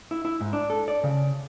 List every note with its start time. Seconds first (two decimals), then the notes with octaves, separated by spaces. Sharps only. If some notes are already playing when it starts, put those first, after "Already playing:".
0.11 E4
0.25 E4
0.41 G#2
0.53 D4
0.70 A4
0.88 D5
1.04 C#3